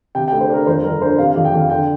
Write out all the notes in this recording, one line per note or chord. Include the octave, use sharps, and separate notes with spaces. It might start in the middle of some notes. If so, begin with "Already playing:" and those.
C3 G5
G5
D2
C5
D4 A#4
F2 C5
G1 A#4
D4 C5
C3 F5
F5
F2
G5
F2 F5
D3 G5